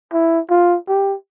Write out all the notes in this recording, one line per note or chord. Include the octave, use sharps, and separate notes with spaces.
E4
F4
G4